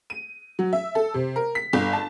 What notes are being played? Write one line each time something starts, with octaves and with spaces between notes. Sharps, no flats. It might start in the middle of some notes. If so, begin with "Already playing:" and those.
D#7
F#3
E5
A4
C3
A#4
B6
G1
A5